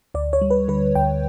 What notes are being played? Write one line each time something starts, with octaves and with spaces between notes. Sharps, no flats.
D2 D5
C#5
G3
B4
D3 B4
D2 G5